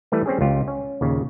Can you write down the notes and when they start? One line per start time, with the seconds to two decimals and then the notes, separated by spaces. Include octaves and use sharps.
0.12 E3 G3 A3 B4
0.26 G3 C4 C#4 G#4
0.41 C#2 F4 G4
0.68 C#4
1.01 D#2 A#2 C#3